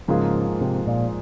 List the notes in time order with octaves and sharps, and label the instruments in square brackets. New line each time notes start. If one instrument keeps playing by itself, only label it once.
[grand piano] G#2 F3 A#3 F4 G#4 [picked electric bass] C#3
[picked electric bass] C3
A#2